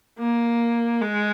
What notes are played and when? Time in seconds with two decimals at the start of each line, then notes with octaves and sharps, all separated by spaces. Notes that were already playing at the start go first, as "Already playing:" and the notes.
0.19 A#3
1.01 G#3